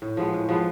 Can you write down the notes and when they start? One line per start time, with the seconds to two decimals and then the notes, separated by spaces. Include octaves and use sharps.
0.02 A2
0.17 F3 G#3 B3
0.33 A2
0.49 F3 G#3 B3